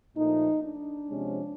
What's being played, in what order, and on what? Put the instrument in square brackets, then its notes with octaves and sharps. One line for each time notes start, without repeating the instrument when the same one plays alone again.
[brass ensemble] A#2 F3 A3 D#4
D4
C3 F3 G#3 C#4